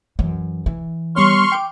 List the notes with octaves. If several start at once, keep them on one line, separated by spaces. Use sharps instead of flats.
F#2 E3
E3
G3 B3 C#5 C6 C#6 F6
G5 D6